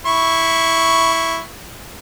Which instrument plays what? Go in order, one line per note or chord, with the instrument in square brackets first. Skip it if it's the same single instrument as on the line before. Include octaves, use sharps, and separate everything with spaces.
[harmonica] E4 C#6